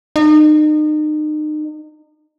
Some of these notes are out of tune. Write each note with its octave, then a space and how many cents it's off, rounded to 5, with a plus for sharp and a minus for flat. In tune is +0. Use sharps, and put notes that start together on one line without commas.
D#4 -35